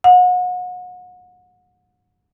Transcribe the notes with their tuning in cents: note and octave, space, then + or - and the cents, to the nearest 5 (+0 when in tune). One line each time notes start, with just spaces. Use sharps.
F#5 -35